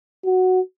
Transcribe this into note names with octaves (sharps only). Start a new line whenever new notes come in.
F#4